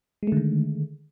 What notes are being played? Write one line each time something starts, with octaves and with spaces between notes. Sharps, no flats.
D3 D#3 G#3 A3